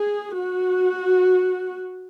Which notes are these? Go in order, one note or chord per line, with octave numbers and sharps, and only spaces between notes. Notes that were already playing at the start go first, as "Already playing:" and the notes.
Already playing: G#4
F#4